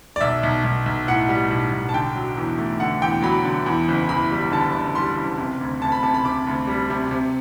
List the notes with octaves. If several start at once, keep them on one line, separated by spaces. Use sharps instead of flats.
D5
B1 E5
B1
B1
B1
A2 F#5
G3
B1
B1
A5
D3 G5
F#3
E2
A3
D3 F#5
E2 G5
F#3 B5
D3
E2
F#1
E2 B5
G3
D3 A5
F#1
G3 C6
F#1
C3
D2
D2 A5
B5
C3 A5
B5
C3 D6
D2
G3
C3
C3